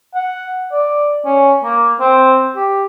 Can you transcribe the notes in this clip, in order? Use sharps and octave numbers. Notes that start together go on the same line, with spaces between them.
F#5
D5
C#4
A#3
C4
G4